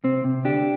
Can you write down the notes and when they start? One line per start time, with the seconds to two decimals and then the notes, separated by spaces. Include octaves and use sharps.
0.04 C3 C4
0.24 C3
0.45 D2 D4 G4